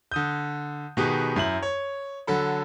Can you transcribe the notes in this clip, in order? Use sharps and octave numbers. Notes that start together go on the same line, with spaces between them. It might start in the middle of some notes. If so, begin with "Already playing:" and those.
D3 D#6 G6
B2 D#3 B3 G4 G#4
F#2 E4 F#7
C#5
D3 F#3 A4 B5